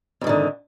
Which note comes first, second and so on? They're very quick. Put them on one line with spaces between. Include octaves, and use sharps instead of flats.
F2 G#2 D#3 D3